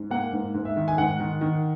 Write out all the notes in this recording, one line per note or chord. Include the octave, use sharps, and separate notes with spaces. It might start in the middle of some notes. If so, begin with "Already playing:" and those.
Already playing: G#2
A#3 F#5
G#2
G#2
E5
D#3
G#5
G#2 F#5
D#3
D#3